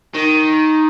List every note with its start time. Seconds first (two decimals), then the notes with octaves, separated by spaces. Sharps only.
0.15 D#3